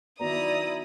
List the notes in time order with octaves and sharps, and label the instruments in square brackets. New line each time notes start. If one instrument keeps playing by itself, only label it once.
[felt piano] D#3 F#3 B3 [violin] E4 D#6 [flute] D5 [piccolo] A#5